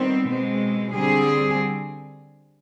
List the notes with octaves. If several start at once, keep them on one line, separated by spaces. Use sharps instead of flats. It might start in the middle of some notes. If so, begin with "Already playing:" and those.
Already playing: D#3 G3 B3 C4
B2 G#3 C4
D3 G3 C4 G#4